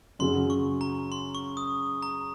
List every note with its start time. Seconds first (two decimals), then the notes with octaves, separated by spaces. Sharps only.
0.19 F#2 C#3 F#3 C#4 G#4 C6
0.50 C#6
0.81 A#5
1.12 C6
1.35 C#6
1.57 D#6
2.03 A#5